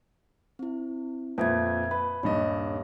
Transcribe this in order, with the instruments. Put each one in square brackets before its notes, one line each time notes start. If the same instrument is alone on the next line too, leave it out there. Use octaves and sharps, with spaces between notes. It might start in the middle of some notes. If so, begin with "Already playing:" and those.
[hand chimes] C4 E4
[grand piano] F2 A#2 [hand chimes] B4 E5 G#6
[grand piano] B4 [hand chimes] B5
[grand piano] D#1 G2 D#5 [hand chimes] C#5